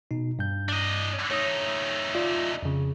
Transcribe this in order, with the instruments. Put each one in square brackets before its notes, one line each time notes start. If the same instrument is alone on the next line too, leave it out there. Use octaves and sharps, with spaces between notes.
[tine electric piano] B2 D#4
G2 G6
[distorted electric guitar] D4 D#5
[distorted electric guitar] A3 D#4 [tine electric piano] C#5 D#6
[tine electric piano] F4 D5
F2 C#3